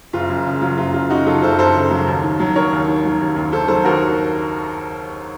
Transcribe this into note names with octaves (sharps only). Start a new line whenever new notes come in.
F#1 F4
F#2
C#3
F#3 F4
F#1 F4
F#2 F4
C#3 D#4 F#4
F#3 F4 A4
F#1 A4 C5
F#2 A4 C5
C#3
F#3
D#2
D#3
F#3
D#2 A#4 C#5
D#2
D#3
F#3
D#2
D#2
D#3 A4 C5
F#3 A4 C5
D#2 F#4 A#4